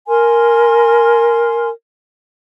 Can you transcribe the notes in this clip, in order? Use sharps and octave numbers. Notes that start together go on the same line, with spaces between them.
A#4 G#5 C6 F6